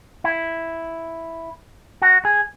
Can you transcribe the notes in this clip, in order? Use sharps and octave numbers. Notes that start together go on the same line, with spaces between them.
E4
F#4
G#4